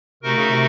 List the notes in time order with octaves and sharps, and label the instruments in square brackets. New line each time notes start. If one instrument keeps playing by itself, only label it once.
[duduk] C3 [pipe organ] A3 D#4 F#4 A#4
[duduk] C#3
C3